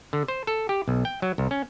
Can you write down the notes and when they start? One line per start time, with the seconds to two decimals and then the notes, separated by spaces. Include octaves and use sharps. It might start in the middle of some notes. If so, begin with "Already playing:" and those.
0.13 D3
0.28 C5
0.47 A4
0.69 G4
0.88 B1
1.05 G5
1.22 F#3
1.38 C2
1.51 C#4